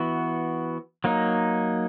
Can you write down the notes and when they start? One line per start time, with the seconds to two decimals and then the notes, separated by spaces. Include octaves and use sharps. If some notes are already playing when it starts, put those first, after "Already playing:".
Already playing: E3 B3 F#4
1.04 F#3 A#3 D#4